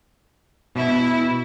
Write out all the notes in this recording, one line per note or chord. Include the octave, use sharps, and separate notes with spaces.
B2 E4